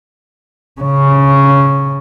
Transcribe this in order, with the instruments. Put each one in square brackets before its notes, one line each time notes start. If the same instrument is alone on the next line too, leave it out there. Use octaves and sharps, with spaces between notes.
[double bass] C#3 C#4